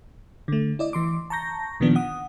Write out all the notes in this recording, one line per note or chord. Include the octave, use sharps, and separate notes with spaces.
D3 A3
E4 D5 D#5
E3 C6 D6
A5 A#5 C#6 G6 A#6
A#2 D#3 F3 B3 D4
F#5 D#6